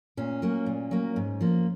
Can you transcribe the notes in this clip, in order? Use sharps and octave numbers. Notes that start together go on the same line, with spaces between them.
A#2 C#4
F#3 A#3
A#2
F#3 A#3
G#2
F3 A#3